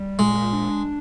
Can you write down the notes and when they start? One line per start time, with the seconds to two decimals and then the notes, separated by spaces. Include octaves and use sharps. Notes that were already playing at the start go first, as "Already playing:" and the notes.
Already playing: G3
0.19 A#2 G#3
0.53 D4